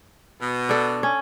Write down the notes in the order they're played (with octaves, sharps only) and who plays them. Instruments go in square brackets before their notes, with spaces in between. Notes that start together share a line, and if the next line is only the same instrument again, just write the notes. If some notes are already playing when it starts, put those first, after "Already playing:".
[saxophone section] B2
[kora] D4 A4
C#4